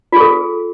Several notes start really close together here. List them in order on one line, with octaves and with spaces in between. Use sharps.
F4 G#4 A4